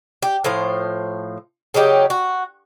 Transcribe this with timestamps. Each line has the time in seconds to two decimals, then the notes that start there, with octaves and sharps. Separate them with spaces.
0.22 G4
0.44 A2 F3 C5
1.74 C#3 F#3 D#4 G4
2.10 F#4